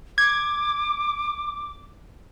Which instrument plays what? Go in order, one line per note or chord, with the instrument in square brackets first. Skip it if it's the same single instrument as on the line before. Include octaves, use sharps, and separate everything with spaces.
[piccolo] D6 [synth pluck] G#6